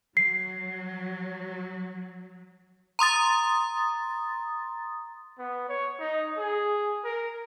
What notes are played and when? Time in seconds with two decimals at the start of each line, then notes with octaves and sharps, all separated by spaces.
0.17 F#3 C7
2.99 A#5 C6 D#6 A6
5.38 B3
5.69 C#5
6.00 D#4
6.38 G#4
7.04 A#4